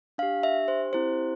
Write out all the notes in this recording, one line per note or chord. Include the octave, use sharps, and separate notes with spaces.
D4 G4 F5
E5
C5
C4 E4 G4 C5